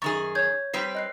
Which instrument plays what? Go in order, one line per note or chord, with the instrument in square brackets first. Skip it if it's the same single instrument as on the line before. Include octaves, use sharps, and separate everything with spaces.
[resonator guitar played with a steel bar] F#2 D#3 G#4 [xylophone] C#6 A6
[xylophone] C#5 G6 G#6
[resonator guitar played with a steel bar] G3 C4 B4 [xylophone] C7
[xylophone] D#5 F#6 C7